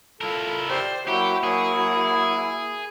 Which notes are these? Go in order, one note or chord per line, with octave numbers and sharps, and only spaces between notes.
E4 F4 A4 A#4
G4 C5 D5
F#3 A#3 E4 G4
F#3 A#3 G#4